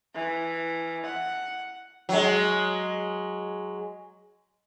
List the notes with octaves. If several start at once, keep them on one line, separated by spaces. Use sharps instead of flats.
E3
F#5
F#3 G#3